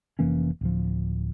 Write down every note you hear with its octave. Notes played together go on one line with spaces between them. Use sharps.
F1 E3 A#3 C#4
D1 F3